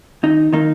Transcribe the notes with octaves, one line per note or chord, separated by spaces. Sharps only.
D#2 D#4
D#3 A#3 D#4